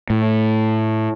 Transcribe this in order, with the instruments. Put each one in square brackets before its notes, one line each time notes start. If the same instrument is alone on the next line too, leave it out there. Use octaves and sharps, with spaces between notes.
[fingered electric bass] A2